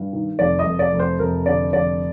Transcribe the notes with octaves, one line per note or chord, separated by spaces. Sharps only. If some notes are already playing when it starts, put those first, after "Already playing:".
Already playing: G2
D#3
F1 D5
D#5
F1
D5
F1
C5
F1 A#4
D3 D5
F1 D5